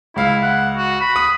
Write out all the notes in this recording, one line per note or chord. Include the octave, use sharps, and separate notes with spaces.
C#2 E4 F5
F#5
F#4
B5
D#6 D#7